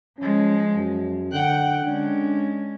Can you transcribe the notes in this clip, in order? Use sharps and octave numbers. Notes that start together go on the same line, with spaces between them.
F3 G#3 C#4
F#2
D3 F#5 G5
G#3 C#4 D4